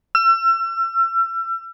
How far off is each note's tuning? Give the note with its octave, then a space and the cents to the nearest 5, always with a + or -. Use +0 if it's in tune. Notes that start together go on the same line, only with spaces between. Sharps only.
E6 +40